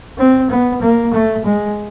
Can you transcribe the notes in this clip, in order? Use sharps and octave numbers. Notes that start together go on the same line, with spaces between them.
C4
B3
A#3
A3
G#3